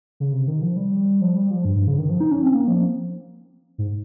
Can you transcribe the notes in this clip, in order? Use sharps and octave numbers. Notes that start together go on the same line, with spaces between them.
C#3
C3
D#3
F3
G3
F3
G3
F3
G2
G2
C#3
D#3
F3
D#4
C#4
C4
A#3
F3
G#2